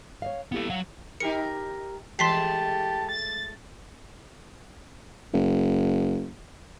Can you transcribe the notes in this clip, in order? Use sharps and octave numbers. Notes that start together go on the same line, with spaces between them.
C#5 D#5 F5
A#3 B3 E4 G4 A4
F#3 F5 F#5
D#4 G4 A#4 C#7
E3 G#3 A3 G4 A5 C6 B6 C7
A6
F#1